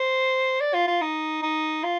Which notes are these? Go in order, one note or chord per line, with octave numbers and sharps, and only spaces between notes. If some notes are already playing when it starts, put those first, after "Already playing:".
Already playing: C5
D5
F4
F4
D#4
D#4
F4